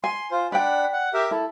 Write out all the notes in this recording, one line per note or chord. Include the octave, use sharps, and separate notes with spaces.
G#5 C6
F4 C5
D4 D5 F#5 G5 B5
F#5
G4 A#4 E5
E4 A4